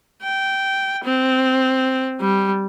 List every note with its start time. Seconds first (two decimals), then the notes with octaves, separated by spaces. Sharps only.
0.23 G5
1.04 C4
2.20 G3